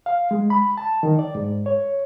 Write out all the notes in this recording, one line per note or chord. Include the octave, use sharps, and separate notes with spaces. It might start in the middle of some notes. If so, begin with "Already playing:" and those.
F5
G#3
B5
A5
D#3
D5
G#2
C#5